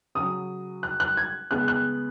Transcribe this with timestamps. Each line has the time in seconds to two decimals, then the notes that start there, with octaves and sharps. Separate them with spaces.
0.15 C#3 F#3 C#4 D#6
0.83 F#6
1.00 F#6
1.17 G#6
1.51 C#3 G#3 B3 F#6
1.68 F#6